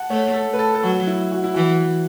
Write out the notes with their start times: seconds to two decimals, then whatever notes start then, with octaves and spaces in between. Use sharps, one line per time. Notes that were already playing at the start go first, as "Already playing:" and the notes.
Already playing: F#5 A5
0.10 A3 C#5
0.34 A4
0.53 B4
0.59 A4
0.75 A4
0.83 F#3 F#4
1.07 E4
1.32 F#4
1.44 E4
1.54 E3 F#4